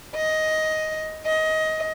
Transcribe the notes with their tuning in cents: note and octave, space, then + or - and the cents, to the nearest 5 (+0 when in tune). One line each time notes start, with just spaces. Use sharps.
D#5 +10
D#5 +20